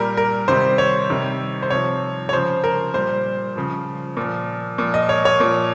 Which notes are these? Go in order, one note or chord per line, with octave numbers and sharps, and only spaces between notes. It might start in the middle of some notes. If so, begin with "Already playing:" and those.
Already playing: A#2 G3 A#4
A#4
C3 D#3 G3 C5
C#5
C3 D#3 G3
C5
C3 F3 C#5
C#5
C#3 F3 C5
A#4
A#2 G3 C5
C#3 F3
A#2 F3
A#2 F3
D#5
C#5
C#5
A#2 F3